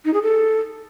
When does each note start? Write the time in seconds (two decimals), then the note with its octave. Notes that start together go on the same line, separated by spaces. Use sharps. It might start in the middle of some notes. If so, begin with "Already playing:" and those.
0.05 D#4
0.14 G#4
0.22 A4